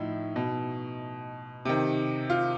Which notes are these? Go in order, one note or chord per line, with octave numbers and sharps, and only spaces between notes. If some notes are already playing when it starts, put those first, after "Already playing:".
Already playing: A2 F3 D#4 E4
B2
C3 D#3
F4 F5